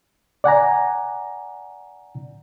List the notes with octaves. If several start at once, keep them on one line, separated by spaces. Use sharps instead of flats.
D5 F#5 G#5 A#5